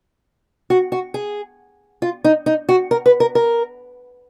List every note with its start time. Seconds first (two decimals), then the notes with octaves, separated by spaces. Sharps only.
0.70 F#4
0.92 F#4
1.14 G#4
2.02 F4
2.24 D#4
2.46 D#4
2.69 F#4
2.91 A#4
3.06 B4
3.20 A#4
3.35 A#4